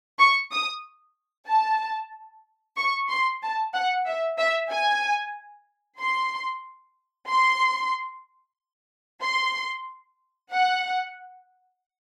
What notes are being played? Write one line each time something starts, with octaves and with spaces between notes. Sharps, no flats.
C#6
D#6
A5
C#6
C6
A5
F#5
E5
E5
G#5
C6
C6
C6
F#5